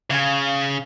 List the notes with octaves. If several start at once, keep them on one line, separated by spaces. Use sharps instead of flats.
C#3 C#5 F5 G#5